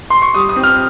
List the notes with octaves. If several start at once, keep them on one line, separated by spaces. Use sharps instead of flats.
C6
C#6
G3 D#6
D#6
C4
F6